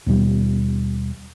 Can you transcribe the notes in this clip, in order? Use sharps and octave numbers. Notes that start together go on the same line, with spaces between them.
D#2 B2 G3